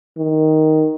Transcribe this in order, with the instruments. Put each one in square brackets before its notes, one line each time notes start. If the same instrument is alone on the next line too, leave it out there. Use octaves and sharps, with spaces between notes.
[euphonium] D#3